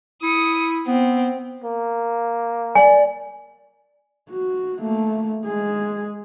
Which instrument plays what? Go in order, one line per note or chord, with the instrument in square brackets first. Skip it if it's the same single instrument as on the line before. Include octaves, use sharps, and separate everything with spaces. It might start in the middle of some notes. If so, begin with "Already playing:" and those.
[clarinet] E4 [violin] D#6 C#7
[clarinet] B3 [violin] C4
[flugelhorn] A#3
[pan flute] D5 [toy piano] G#5
[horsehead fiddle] F#4
A3 A#3
G#3 G#4